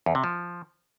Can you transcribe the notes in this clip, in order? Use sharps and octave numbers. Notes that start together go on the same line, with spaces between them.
E2
C3
F3